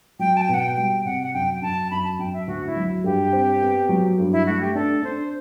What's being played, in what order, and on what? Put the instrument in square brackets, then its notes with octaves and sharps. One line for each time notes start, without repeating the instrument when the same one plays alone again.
[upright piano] F#3 [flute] G5
[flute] A5
G5
[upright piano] B2
[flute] F#5
G5
[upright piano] G3 [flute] G5
[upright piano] C3 [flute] F#5
[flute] F#5
[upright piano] F#2 [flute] G5
[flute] G5
[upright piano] F#2 [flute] A5
[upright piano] F#2 [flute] B5
[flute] A5
[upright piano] F#2 [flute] G5
[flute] E5
[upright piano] D2 [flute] F#4
[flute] E4
[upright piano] F#3
[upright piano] G2 [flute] G4
[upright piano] C4
B3
F#3
G2
[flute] E4
[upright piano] A3 [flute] F#4
[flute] G4
[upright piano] D4 [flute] A4
[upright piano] D4 [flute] C5